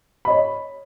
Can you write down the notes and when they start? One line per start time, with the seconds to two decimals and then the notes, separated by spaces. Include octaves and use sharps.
0.25 B5
0.28 D#5
0.30 C#5